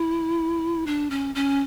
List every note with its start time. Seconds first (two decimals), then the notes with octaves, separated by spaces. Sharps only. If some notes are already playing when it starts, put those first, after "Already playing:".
Already playing: E4
0.86 D4
1.10 C#4
1.35 C#4